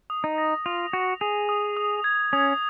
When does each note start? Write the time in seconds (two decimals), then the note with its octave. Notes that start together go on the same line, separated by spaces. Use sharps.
0.10 D#6
0.24 D#4
0.38 A#6
0.66 F4 F7
0.93 F#4 D#6
1.21 G#4 F7
1.49 D#6
1.77 D#6
2.04 G#6
2.33 C#4 D#6